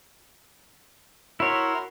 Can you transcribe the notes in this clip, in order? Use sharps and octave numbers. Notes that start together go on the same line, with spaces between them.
E4 F#4 A#4 C#5 C6